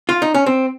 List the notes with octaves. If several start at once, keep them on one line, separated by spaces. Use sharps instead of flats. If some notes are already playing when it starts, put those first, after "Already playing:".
F4
D#4
C#4
C4